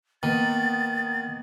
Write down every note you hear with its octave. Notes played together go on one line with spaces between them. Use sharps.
D#3 A#3 B3 A6